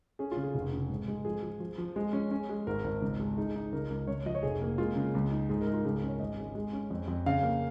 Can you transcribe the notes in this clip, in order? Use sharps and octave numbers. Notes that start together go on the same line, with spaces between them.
C#4 G#4
F4
C#3
G#4
F1
C#3
G#2
G#3
F3 G#4
F3
F3
F3
G#3
C#4
C#4
G#3
G#1 A#4
G#1
C#2
G#3
D#4 G#4
D#4
C#2 A#4
C#2
C#2 C#5
F3 D#5
C#5
F1 G#4
A#3
G#3 F4
C#3
C#2
D#4
G#2 G#4
A#4
D#4
F4
C#2 G#4
A#4
C#4
C#5
G#1 D#5
G#3
G#3
C#4
F2
F2
C#3 F5
A#3